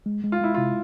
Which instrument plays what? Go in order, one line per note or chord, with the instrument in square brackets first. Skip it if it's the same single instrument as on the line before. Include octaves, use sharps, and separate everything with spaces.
[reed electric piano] G#3
G#3
[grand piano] F4
[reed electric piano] G#3 [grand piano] E4
[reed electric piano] C3 [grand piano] F4